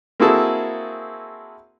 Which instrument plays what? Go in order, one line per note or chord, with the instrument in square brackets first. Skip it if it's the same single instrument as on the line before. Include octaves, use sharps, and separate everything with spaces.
[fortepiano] A#3 C4 E4 F#4 G#4 A4